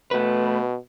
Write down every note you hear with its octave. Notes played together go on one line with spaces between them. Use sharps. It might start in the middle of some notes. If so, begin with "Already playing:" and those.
B2 A3 B4